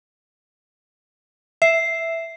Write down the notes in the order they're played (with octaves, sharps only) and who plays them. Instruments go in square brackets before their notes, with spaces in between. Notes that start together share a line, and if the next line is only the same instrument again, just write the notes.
[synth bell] E5 [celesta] C7